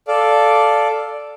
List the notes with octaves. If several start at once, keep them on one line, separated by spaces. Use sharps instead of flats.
A4 D5 F5